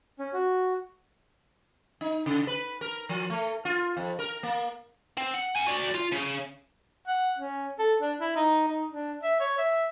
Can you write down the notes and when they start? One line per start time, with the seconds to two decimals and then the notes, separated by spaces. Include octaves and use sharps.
0.19 C#4
0.33 F#4
2.01 D#4
2.26 C#3
2.47 B4
2.81 A#4
3.09 F3
3.30 A3
3.65 F4
3.97 F2
4.19 A#4
4.43 A#3
5.17 C4
5.34 F#5
5.56 F#5 G#5
5.67 F#4 D5
5.95 F4
6.12 C#3
7.07 F#5
7.39 C#4
7.79 A4
8.02 D4
8.21 E4
8.36 D#4
8.67 D#4
8.92 D4
9.23 E5
9.40 C#5
9.58 E5